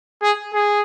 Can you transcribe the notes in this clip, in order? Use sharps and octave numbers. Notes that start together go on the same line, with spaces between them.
G#4
G#4